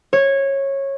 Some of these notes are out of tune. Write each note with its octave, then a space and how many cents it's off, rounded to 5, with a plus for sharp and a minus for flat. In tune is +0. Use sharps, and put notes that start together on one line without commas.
C#5 -15